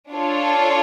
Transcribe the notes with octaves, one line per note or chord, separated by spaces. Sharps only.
D4 F4 A4 C#5